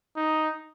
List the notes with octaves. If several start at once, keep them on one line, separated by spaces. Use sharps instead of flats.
D#4